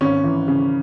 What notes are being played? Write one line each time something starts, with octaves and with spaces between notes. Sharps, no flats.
G#1 C#4
E3
C#3